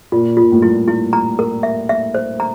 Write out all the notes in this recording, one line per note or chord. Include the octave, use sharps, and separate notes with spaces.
A#2 F4
F4
A#2
A2
G2 E4
E4
A#5
A#4
E5
E5
C5
A#5